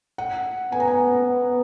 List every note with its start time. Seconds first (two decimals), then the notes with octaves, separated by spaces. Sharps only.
0.18 F#5
0.72 B3 G#5
0.80 A#5
0.88 G#5
1.27 B3